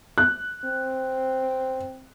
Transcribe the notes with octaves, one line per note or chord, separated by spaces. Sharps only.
F#6
C4